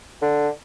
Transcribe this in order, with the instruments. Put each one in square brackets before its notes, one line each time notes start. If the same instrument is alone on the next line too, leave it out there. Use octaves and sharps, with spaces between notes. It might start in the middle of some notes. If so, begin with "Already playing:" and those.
[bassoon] D3